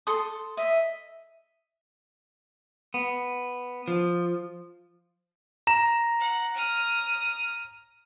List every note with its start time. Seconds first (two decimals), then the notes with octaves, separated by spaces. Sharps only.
0.07 A4 C6 D#6
0.57 D#5 E5
2.94 B3
3.88 F3
5.67 A#5 E7
6.20 F#5
6.56 D#6 F6